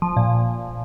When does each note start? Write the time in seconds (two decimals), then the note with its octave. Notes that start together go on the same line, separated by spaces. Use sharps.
0.02 F3
0.17 A#2